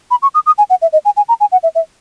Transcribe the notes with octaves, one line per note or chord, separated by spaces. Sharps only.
B5
C#6
D#6
D#6
G#5
F#5
E5
D#5
G#5
G#5
A#5
G#5
F#5
E5
E5